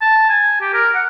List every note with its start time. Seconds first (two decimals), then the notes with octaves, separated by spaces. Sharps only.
0.02 A5
0.30 G#5
0.61 G4
0.74 A#4
0.95 F#5